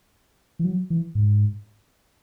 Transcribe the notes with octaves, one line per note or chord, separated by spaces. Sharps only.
E3
F#3
E3
G#2